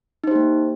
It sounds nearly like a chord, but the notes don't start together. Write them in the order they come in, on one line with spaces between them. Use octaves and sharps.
D#4 C5 G4 A#3